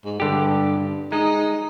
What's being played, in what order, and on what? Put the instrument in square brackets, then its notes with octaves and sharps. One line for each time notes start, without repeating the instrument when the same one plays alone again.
[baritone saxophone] G#2
[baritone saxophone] G2 [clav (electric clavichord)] D3 G4
[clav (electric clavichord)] G#3 [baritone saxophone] D#4